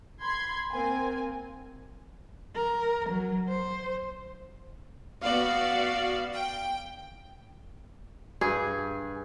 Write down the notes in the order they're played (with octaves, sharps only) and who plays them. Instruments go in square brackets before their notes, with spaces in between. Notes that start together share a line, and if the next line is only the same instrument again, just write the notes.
[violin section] B5 C6 G#6
A#3 C4 G#5
[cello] A#4
F#3
C5
[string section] B3 F#4 D5 [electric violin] F5
[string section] G5
[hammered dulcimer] G2 [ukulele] G#4